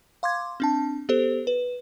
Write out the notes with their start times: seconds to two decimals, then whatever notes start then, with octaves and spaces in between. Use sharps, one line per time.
0.23 F5 C6 D6 G#6
0.60 C4 D4 A5
1.09 B3 G4 A4 C5
1.47 B4